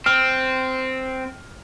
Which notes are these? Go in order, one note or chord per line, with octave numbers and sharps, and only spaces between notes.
C4 F6